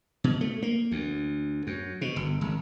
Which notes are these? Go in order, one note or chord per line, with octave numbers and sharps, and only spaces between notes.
B2
A3
A#3
D2
F#2
B2
G1
G#1